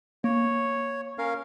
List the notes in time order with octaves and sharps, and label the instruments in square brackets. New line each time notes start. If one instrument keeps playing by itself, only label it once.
[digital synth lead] A#3 [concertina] C#5
[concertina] C#4 A#4 F5